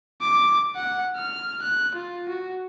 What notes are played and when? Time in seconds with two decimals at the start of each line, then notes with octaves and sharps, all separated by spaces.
0.21 D6
0.76 F#5
1.16 F6
1.62 F#6
1.95 F4
2.29 F#4